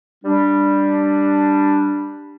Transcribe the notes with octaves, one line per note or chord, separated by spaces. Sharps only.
G3 D4